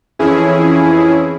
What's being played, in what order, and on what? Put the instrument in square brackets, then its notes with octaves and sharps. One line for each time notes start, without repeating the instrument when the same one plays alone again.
[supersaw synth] F2 E3 C#4 E4 G#4